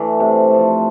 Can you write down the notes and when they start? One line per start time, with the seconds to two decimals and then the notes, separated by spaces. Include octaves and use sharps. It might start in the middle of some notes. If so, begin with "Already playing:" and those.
Already playing: E3 A3 D4
0.20 C3
0.51 F3 A3